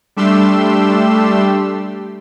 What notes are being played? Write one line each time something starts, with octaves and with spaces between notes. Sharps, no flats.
G3 A3 D4 G4 C6 E6